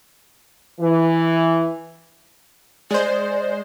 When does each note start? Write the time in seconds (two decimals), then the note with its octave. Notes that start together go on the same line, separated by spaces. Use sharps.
0.81 E3
2.91 G#3 C5 D5